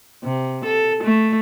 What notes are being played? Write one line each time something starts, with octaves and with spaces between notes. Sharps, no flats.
C3
A4
A3